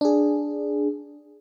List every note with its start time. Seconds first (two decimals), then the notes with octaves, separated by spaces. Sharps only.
0.01 D4 G#4